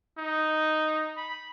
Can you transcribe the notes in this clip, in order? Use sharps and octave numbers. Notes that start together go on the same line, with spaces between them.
D#4
B5